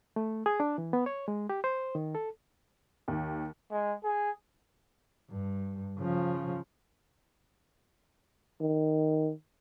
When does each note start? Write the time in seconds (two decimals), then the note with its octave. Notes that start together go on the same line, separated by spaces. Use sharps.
0.16 A3
0.46 G#4
0.60 D4
0.78 E3
0.93 B3
1.06 C#5
1.28 G#3
1.49 G4
1.64 C5
1.95 D#3
2.15 A4
3.08 D#2
3.71 G#3
4.04 G#4
5.30 G2
5.99 C#3 F3
8.61 D#3